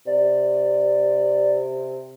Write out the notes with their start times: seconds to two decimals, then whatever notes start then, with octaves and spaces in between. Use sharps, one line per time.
0.07 C3 D5